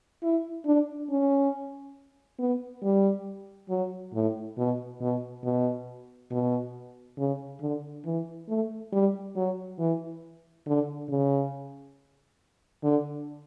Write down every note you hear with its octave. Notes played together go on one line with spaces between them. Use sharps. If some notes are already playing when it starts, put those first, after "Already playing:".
E4
D4
C#4
B3
G3
F#3
A2
B2
B2
B2
B2
C#3
D3
E3
A3
G3
F#3
E3
D3
C#3
D3